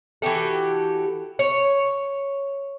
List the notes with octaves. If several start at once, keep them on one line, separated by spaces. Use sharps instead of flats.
E3 F#4 G4 A4
C#5